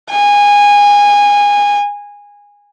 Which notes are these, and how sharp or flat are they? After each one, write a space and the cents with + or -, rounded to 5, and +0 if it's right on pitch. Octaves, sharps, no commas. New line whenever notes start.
G#5 -20